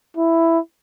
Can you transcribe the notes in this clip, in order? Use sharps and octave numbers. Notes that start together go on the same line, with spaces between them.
E4